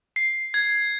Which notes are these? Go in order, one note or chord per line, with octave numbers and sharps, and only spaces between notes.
C7
G#6